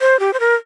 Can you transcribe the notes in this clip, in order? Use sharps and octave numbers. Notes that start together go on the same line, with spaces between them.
C5
G4
C5
A#4